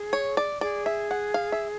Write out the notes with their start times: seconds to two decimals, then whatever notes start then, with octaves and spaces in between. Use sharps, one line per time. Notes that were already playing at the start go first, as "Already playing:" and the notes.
Already playing: G#4
0.13 C#5
0.37 D5
0.61 G#4 D5
0.86 E5
1.11 F#5
1.34 F5
1.52 E5